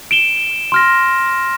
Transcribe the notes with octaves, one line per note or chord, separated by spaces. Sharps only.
D7 E7 G7
C6 F6 A#6